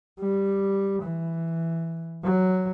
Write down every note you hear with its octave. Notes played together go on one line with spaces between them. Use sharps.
G3
E3
F#3